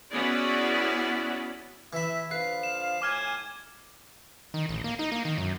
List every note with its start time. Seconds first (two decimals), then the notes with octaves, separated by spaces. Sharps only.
0.12 B3 C#4 E4 F#4 G#4 D5
1.93 E3 E5 B5
2.31 D3 F3 B4 F5 C7
2.63 E7
3.02 A2 G#5 D6 F6 G#6
4.54 D#3
4.69 A1
4.84 A#3
4.99 D#4
5.12 A#3
5.25 D#3
5.38 F#2